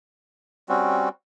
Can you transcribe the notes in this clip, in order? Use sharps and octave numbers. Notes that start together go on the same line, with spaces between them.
G3 C4 C#4 F#4